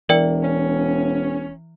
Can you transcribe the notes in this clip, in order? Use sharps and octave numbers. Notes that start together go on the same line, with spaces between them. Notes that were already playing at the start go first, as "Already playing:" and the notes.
E1 E3 A#4 D5 G5
C#4